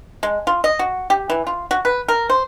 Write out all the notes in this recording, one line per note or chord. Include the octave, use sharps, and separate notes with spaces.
G#3
F4
D#5
F#4
G4
E3
F4
F#4
B4
A#4
C5